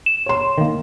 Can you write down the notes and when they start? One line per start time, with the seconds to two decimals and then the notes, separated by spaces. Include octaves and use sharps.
0.06 E7
0.26 C#5 C6
0.58 D#3 A#3